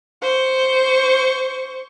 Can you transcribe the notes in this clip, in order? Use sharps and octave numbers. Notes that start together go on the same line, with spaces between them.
C5 C#6